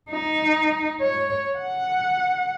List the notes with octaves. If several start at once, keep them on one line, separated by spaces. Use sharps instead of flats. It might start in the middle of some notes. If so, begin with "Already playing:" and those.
D#4
C#5
F#5